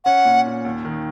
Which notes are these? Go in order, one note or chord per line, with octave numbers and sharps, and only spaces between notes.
C#4 F#5
A#2
A#2
D#2
D#3